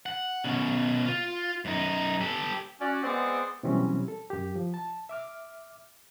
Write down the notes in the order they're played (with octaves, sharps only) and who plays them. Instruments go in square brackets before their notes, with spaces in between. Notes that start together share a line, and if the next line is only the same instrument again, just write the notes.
[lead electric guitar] F#5
B2 C#4
F4
F#2 D#4
G4 A4
[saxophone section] C#4 F#4 D5
G#3 B3 C4 G#4 D5 F#5
[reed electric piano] B2 E3 F#3 G3 C4 C#4
A4
F#2 G4
F3
A5
E5 D6 F6